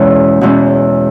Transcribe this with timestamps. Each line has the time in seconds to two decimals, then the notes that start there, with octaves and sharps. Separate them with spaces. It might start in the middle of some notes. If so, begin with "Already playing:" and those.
Already playing: E2 B2 G#3 C#4
0.41 E2 B2 G#3 C#4